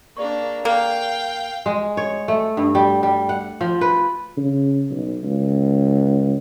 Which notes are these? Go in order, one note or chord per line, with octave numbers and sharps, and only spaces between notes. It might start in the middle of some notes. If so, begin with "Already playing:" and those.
A#3 D4 G#4 D5 C#6
A#3 F5 G5
G#3
C#5
A3
G2
G3
G3
F#5
F3
B4
C#3
B1
C#2